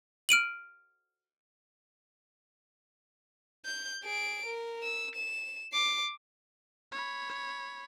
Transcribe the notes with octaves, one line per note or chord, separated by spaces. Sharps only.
F6 D7 D#7 F#7
G6
G#4 D7
A#4
E6
E7
D6 C7
C#5 B5